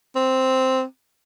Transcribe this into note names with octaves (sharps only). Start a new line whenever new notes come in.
C4